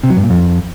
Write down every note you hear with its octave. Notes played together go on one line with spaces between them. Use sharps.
C3
F#3
G2
A#2
F2